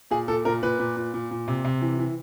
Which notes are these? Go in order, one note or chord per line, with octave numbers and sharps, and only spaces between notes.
A#2 G#4
A#2 A4
A#2 A#4
A#2 B4
A#2
A#2
A#2
A#2
C3
C3
E3
E3